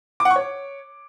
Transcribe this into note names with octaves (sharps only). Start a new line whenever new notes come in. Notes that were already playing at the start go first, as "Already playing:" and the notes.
D6
F#5
C#6
C#5